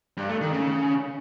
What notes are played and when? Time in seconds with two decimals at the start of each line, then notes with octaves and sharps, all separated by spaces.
0.17 G2
0.29 A3
0.41 D#3
0.53 C#3